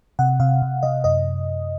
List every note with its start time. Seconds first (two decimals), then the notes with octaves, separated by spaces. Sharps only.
0.19 C3 F#5
0.40 C3 F5
0.62 C3
0.83 C3 D#5
1.04 F#2 D#5